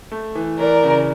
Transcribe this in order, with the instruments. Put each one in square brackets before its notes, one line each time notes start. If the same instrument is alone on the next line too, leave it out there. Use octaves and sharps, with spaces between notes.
[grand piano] A3
E3
[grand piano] E3 [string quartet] A#4 D5
[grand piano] C#3